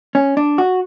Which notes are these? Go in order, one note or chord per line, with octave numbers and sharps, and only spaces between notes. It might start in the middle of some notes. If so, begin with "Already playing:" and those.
C#4
D4
F#4